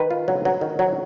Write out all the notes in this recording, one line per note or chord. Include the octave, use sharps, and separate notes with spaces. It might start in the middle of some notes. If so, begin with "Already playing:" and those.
Already playing: D#3 B4
F4
F#3
F#3
D#3
F#3